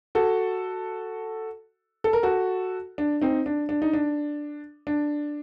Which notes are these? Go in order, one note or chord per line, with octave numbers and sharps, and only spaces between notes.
F#4 A4
A4
A#4
F#4 A4
D4
C4 D#4
D4
D4
D#4
D4
D4